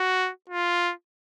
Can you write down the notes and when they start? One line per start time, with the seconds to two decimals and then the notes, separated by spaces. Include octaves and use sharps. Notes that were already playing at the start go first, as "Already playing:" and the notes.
Already playing: F#4
0.50 F4